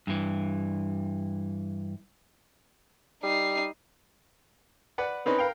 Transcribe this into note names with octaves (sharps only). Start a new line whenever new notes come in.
G2 E3
G3 D#4 C7
B4 D5 F#5
C4 C#4 D#4 B4
A#4 F5 G5